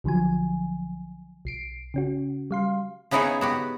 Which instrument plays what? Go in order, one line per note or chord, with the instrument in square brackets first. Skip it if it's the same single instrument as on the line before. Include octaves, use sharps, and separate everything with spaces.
[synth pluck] B1 D3 F3 F#3 G#5
B1 C7 D7
C#3 C#4 F#4
G3 F5 C6
[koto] C#3 B3 D#4 E4 G#4 C#5
B3 F#4 G4